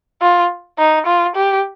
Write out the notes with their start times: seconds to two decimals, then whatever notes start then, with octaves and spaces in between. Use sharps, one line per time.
0.22 F4
0.78 D#4
1.06 F4
1.36 G4